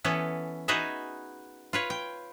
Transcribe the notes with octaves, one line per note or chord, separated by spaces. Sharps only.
E3 B3 C#4 A4
D#4 F#4 G#4 B4 D#5 E5
F4 B4 C#5
G5